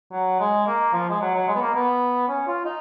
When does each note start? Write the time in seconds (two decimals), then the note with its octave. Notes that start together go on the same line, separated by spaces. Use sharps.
0.11 F#3
0.40 G#3
0.67 A#3
0.93 F3
1.10 G#3
1.21 F#3
1.34 F#3
1.48 G#3
1.55 B3
1.61 A#3
1.75 B3
2.28 C#4
2.47 F4
2.65 D#4